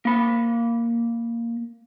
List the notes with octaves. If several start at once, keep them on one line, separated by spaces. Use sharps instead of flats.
A#3 B5